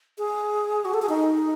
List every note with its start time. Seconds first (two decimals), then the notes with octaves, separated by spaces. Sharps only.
0.18 G#4
0.85 F#4
0.94 A4
1.02 G#4
1.09 D#4